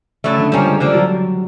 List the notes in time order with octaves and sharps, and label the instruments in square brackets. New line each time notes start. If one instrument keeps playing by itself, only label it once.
[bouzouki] A2 F#3 A3 [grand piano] C#3
[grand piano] D3
[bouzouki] F3 A#3 C#4 [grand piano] G3
[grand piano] G#3
[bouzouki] D3 F3 A#3 [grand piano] G3
[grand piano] F#3